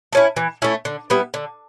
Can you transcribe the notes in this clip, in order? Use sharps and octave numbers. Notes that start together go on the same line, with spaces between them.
A3 C#4 E4
E3
A3 C#4 E4
D3
G3 B3 E4
D3